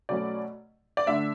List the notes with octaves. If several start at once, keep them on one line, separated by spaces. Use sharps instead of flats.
B2 F#3 A3 C#4 D5
D5
D3 A3 D4 E5